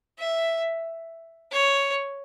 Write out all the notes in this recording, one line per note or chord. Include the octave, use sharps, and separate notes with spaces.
E5
C#5